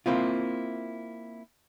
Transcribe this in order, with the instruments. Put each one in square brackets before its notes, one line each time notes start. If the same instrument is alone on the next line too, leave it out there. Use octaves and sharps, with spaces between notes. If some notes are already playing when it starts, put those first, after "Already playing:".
[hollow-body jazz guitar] A#3 C4 E4 F4